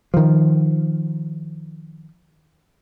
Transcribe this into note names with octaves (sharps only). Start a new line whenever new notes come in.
D#3 F3